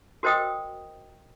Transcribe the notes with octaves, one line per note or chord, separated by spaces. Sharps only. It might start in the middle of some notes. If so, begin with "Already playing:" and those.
F#4 A#4 C5 D#5 G5 D#6